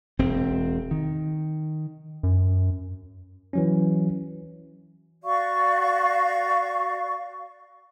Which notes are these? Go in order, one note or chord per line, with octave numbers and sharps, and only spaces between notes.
E1 C4
D#3
F#2
E3 F#3 C#4
F#4 D5 F5 C#6